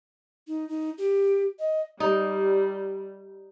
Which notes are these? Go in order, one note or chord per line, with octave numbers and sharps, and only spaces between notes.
D#4
D#4
G4
D#5
G3 D#4